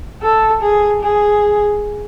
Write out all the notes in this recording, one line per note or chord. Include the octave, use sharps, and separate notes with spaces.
A4
G#4
G#4